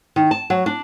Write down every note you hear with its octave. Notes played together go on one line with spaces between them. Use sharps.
D#3
A5
F#3
D4